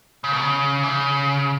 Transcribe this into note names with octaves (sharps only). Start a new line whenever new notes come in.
C#3
B2
C#3
E3
C#3